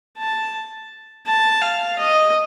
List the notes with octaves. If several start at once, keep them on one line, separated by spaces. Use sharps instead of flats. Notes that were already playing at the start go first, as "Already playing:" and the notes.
A5
A5
F5
D#5